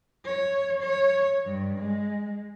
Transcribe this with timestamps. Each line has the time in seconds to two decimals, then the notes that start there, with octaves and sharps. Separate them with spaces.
0.25 C#5
0.81 C#5
1.45 G2
1.78 G#3